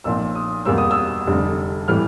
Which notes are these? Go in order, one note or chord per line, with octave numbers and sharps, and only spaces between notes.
B1 A#2 F3 E6
D#6
E2 B2 G3 A#3 E6
D#6
E6
F1 F2 D3 G3
A2 E3 G3 F6